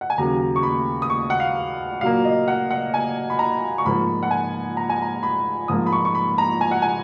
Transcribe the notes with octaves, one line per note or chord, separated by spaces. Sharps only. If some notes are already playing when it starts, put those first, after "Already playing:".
F#5
G#5
D#2 C#3 F#3 A#3 A#5
C#6
B5
D#6
C#6
F#5
F5
A#2 F#3 A#3 F5
D#5
F#5
F#5
G#5
B5
A#5
C#6
G#2 F3 A#3 B5
F#5
G#5
A#5
G#5
A#5
B5
G#2 F3 A#3 D#6
B5
C#6
C#6
B5
A#5
G#5
F#5
G#5